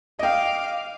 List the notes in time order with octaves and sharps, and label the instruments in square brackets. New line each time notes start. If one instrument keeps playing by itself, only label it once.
[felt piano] D#5 G5 [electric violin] F5 D6